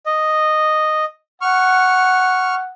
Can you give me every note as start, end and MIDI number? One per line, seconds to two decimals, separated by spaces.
0.06 1.05 75
1.41 2.72 78
1.41 2.55 85
1.41 2.55 89